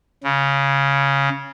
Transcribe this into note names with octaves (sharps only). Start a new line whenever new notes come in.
C#3